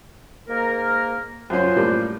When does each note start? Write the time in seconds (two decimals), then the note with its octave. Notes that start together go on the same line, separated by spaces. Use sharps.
0.48 G#2 A#3 A#4
1.50 F#2 C#4 F4 C5
1.76 A2 G3 A#3